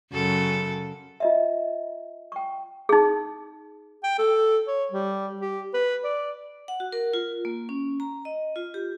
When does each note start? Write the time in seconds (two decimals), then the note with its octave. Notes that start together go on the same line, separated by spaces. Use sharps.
0.12 F#2 C#3 A4
1.20 F4 D#5 E5
2.32 G5 C#6
2.89 D#4 G#4
4.03 G5
4.19 A4
4.67 C#5
4.92 G3
5.41 G4
5.74 B4
6.04 D5
6.68 F#5
6.80 F#4
6.92 A#4
7.13 F4
7.45 A#3
7.69 C#4
8.00 A#5
8.25 D#5
8.56 F4
8.74 G4